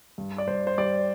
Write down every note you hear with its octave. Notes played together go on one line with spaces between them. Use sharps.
G2
D5
G2 C5
C5
G3 D5